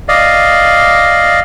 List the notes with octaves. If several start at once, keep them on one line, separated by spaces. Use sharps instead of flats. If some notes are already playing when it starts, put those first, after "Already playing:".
D5 D#5 F5